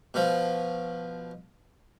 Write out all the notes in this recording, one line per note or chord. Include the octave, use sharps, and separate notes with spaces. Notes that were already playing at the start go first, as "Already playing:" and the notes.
B2 F3